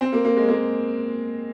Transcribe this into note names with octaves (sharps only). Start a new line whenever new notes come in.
C4
A#3
A#3
G#3
A#3